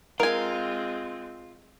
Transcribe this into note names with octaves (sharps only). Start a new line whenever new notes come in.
G#3 C4 F4 A#4 G#5